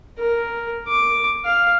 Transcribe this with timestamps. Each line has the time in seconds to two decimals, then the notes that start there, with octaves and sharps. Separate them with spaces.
0.18 A#4
0.88 D6
1.45 F5